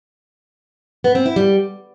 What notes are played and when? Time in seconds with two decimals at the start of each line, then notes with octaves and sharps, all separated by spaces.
1.04 B3
1.15 C4
1.26 E4
1.36 G3